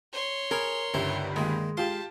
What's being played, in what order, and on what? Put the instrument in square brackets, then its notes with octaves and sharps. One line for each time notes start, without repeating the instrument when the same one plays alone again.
[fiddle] C#5 C6
[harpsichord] G#4 G#5 [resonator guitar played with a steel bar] A#4
[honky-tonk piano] G1 C#2 G2 [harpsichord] E4
[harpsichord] D#3 A#3 [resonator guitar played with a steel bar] G#3
[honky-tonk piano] F4 G4 [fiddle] A5 [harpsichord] C6